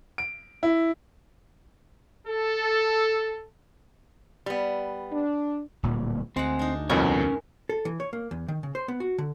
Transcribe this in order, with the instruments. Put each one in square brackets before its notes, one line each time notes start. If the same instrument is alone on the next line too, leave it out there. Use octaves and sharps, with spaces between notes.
[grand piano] D7
E4
[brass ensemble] A4
[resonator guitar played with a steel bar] G3 B3
[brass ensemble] D4
[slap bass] D1 A#2 G3
[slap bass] D2 [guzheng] G#3 F#5 [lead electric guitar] C4
[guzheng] D4 D#4
[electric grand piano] C2 F2 B2 [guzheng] G#3 A#4 B4 [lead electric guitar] C#4 C#5
[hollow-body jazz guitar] A4
E3
C#5
A#3
E2
D#3
C#3
C5
B3
F#4
D3